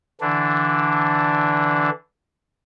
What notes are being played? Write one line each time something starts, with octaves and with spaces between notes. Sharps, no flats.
D3 E3 D4